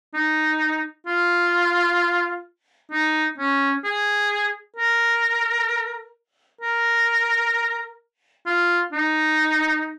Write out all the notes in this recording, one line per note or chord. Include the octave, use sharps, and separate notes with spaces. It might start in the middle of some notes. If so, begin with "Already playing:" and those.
D#4
F4
D#4
C#4
G#4
A#4
A#4
F4
D#4